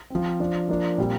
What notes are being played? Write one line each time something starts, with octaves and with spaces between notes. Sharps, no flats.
F3 C4
F3 D4
F3 A#3 D4
A#2 G3 C4